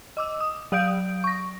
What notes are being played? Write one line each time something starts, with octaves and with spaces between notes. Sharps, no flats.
D#5 D6 E6
D#6
F#3 D5 F5 D#6 G6 D7
C#6 A#6